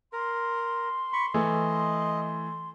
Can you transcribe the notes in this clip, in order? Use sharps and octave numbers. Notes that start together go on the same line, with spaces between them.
A#4 C6
B5 C#6
E3 A3 D#5